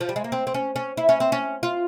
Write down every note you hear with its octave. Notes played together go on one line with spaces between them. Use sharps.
F3
G3
G#3
A#3
C4
C4
C#4
C#4
E4
C#4
C4
C#4
F4